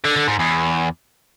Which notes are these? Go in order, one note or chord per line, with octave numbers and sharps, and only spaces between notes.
D3
D3
G#2
E2